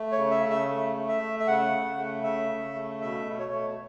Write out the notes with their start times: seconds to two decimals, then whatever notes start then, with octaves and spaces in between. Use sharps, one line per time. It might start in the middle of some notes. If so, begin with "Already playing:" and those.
Already playing: A3
0.12 C#5
0.18 C#3
0.31 E5
0.43 C#3
0.50 E5
0.70 A3
0.96 A3
1.08 E5
1.21 A3
1.40 E5
1.47 C#3 F#5
1.73 C#3
1.98 A3
2.23 C#3 E5
2.50 C#3
2.75 A3
3.01 B2 E5
3.26 B2
3.39 C#5
3.52 A3